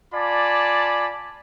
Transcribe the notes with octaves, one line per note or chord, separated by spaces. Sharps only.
F4 D5 G#5 A5 B5 D6